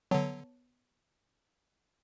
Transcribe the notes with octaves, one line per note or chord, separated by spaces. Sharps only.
D3 F#3 B3 C#5 A5